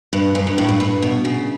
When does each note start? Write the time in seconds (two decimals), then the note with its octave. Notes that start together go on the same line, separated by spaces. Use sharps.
0.13 G2
0.35 F#2
0.47 G2
0.58 A2
0.69 G2
0.80 G2
1.02 B2
1.25 C#3